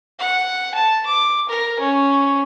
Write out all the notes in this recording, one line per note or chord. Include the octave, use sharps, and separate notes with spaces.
F#5
A5
D6
A#4
C#4